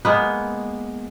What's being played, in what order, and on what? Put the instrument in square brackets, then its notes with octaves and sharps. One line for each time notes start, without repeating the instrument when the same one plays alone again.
[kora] G#3 A#3 B3